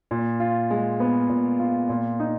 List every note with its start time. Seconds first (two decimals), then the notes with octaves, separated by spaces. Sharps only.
0.11 A#2
0.40 F4
0.70 G#3
1.00 B3
1.29 A#2
1.59 F4
1.89 A#2
2.20 D#4